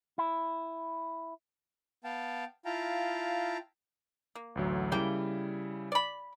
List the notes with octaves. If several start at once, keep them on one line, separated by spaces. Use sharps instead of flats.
E4
B3 F5 G5 A5
E4 F4 F5 G5 A5 A#5
A#3
A1 D2 F#3
C#3 G3 A#3 E4 G5
D5 B5